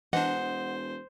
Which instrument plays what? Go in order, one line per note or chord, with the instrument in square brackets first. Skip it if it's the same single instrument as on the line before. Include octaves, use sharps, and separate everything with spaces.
[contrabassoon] E1 [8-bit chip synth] E3 D4 [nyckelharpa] C5 [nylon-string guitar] D#5 F#5